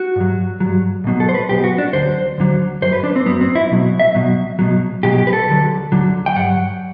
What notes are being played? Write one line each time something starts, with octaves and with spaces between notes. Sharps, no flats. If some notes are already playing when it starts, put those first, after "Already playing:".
Already playing: F#4
G2 F#3
G2 F#3
B1 B2 F#3
A4
C5
B4
B1 B2 F#3 G4
F#4
D4
D2 D3 F#3 C5
D2 D3 F#3
F#2 F#3 C5
B4
D4
C4
F#2 F#3 B3
C4
E4
B1 B2 F#3
E5
B1 B2 F#3
B1 B2 F#3
B1 B2 F#3 G4
G4
B4
A4
D2 D3 F#3
D2 D3 F#3
G5
G2 F#3 F#5